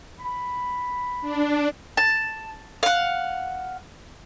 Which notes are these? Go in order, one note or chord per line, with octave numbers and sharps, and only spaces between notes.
B5
D4
A5
F5 F#5